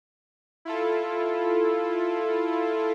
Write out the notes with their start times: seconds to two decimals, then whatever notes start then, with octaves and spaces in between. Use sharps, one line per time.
0.65 E4 F4 A4